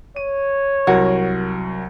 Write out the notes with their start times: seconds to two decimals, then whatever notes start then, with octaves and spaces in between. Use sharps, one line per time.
0.16 C#5 D#7
0.87 C2 F#3 F#4 A#4